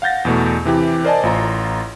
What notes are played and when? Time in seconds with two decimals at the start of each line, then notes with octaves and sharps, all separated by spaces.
0.02 F5 F#5 G6 A6 A#6
0.25 E2 B2 A3
0.65 C3 E3 G4
1.04 A#4 C5 D5 D#5 G#5 A5
1.23 A1 F4 A#5